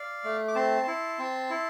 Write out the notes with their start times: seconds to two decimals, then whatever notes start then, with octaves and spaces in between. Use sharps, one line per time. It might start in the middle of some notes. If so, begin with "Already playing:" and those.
Already playing: D5 F5
0.24 A3
0.48 D6
0.55 C4 A5 C6
0.88 E4
1.19 C4
1.50 E4